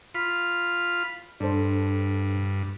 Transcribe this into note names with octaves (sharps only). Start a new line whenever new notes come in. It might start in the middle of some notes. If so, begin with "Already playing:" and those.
F4 B5
G2 D4 A4 C5